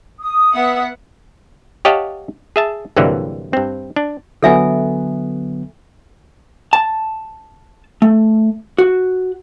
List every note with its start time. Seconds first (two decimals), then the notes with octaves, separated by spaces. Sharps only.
0.20 D#6
0.54 B3 E5 F#5
1.85 G4 C#5 D#5 F5 F#5 A5
2.56 G#4 E5 A5
2.96 C2 G2 D3 E3 F#3 A#3
3.53 G2 C4
3.96 D4
4.43 D3 F#3 B3 A4 E5 G#5
6.73 A5
8.02 A3
8.78 F#4